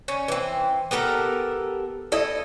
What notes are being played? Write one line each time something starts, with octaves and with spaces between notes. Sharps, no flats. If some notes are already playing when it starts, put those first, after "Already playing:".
C#4
E3 C4
B3 G4 A4 A#4
E4 A4 D#5